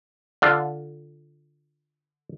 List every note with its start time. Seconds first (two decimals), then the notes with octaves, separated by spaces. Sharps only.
0.42 D3 F4